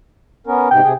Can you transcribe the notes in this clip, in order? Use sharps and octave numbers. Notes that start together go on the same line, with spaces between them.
B3 C#4 A#4
G#2 C3 G5
C3 G#4